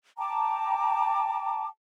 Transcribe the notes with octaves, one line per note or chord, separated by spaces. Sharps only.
G5 A5 A#5 D6